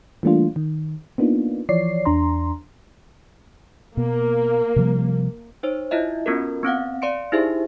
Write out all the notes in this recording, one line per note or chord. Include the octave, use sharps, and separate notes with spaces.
E3 G3 A3 A#3 D4 F4
D#3
A#3 B3 D4 D#4 F4
E3 F3 C#5 D5 C7
E2 D4 A#5 C6
B2 A#3
C3 F3 G3
D#4 C5 C#5
E4 F4 D#5 E5
B3 C#4 F4 F#4 A4 A#4
B3 C4 F5 F#5
D5 F5 C6 C#7 D7
D#4 E4 G4 G#4 C5 E5